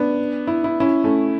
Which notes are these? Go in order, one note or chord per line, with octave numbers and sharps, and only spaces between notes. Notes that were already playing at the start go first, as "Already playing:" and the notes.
Already playing: B3 D4
E4
E4
C#4 E4
A3 C#4